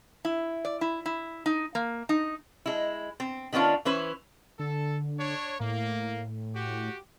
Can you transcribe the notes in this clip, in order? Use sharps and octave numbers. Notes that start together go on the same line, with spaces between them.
E4
D5
E4
E4
D#4
A#3
D#4
G#3 E4
C4
D#3 B3 C#4 D4 F4
E3 C#4 B4 C5 E5
D3 A4
D4 C#5
A2 A#3
F#4 G4